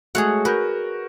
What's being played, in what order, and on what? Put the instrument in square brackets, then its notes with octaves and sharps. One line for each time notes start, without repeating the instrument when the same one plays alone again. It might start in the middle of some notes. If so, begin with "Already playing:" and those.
[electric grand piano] G#3 A3 F#4 [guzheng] G#4 C#5 F#5
[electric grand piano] F#4 A#4 G6 [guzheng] B4